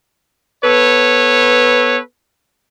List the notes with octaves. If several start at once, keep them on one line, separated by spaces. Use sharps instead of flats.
B3 A4 B4 C#5